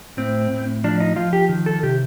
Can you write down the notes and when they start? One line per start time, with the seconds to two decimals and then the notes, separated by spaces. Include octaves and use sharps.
0.17 A2 C4
0.50 A2
0.84 F3 D4
1.00 D#4
1.16 F3 F4
1.33 G4
1.49 D#3
1.66 A4
1.83 C3 G4